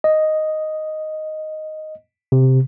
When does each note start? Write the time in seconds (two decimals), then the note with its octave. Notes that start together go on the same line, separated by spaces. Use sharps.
0.04 D#5
2.32 C3